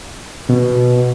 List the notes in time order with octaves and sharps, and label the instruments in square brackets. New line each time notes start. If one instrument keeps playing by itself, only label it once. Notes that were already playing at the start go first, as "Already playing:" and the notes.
[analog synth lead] B2